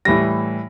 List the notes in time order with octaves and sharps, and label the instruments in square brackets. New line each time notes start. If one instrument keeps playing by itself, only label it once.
[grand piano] A2 E3 G3 A#6